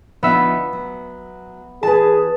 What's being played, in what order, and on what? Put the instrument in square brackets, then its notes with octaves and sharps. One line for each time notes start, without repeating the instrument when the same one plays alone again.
[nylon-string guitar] D3 F3 D#4 [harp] B3 E5
[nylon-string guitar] F#3
[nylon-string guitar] E3 B4 [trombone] G#4 [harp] A5